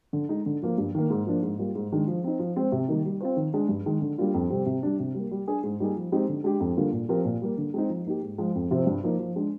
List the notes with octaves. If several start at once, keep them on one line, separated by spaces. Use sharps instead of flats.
D3
G#3 D#4
D3
F3 A#3 F4
G2
D#3 A#3
G#2
F3 A#3 D4
G#2
G3 A#3 F4
G#2
D#3 G#3 D4
F3
C4 D#4
F3
G#3 C4
C3
D#3 G3 A#3 D#4
G3
C4 F4 C5
D#3
G#3 D4 G#4
G2
D#3 G#3
D3
G3 A#3 D4 F4
F2
C3 G3 C4 G4
C3
G3 D4
C3
G3 A#3
G3
D4 G#4
G#2
G3 A#3 D#4 G#4
F3
G#3 C4 D#4 G4
D3
G#3 D4 G4
F2
D3 G3 A#3 F4
A#2
F3 C4 G4 A#4
A#2
G3 A#3
D3
G#3 C4 D#4
F3
A#3 D#4 G4
G#2
F3 G#3
F2
C3 F3 C4 F4
G2
F3 A#3 D#4
F3
G#3 D4